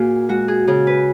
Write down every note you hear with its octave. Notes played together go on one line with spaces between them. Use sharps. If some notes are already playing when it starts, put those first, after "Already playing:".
Already playing: A#2 A#3 F#4 G#4 A#4
G#3 F#4
G#4
C#3 G#4
B4